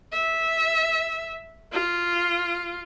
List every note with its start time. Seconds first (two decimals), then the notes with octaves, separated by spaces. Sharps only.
0.13 E5
1.72 F4